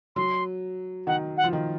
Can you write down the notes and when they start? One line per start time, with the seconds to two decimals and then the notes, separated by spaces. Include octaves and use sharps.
0.16 F#3 C6
1.07 D#3 F#5
1.37 F#5
1.44 F3
1.53 D#3